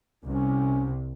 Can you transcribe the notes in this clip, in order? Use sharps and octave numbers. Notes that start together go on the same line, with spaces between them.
C2 C3 C#4